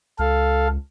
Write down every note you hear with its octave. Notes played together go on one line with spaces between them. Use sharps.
C#2 A4 F5